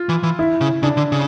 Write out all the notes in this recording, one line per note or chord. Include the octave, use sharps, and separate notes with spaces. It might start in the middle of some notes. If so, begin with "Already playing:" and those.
Already playing: F4
E3
E3
E4
C#3
C#3 D4
D3
C#3